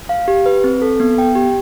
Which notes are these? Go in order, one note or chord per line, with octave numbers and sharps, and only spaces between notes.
F5
G4
B4
C4
A4
B3
G5
G4